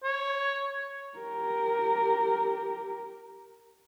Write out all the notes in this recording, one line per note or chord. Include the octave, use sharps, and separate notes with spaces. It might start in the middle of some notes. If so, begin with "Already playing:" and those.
C#5
G4 A#4